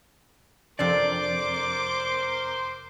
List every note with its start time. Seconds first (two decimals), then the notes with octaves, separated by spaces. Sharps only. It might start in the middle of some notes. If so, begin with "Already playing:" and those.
0.79 F2 C3 D4 A#4 C5 D5 C6 D6